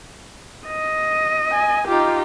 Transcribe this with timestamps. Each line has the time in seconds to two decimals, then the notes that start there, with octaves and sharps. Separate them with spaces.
0.67 D#5
1.52 G#5
1.88 D#4 F4 G4